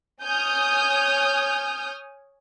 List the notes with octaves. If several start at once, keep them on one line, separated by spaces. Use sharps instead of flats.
C#5 G#5 D#6 F6 G6